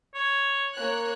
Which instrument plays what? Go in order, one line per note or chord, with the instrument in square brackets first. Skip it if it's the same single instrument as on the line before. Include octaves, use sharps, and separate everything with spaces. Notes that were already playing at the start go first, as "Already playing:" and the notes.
[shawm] C#5
[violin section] A#3 C#5 F#6